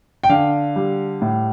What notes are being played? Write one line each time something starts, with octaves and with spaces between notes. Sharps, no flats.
G5
D3 F5
G3
A2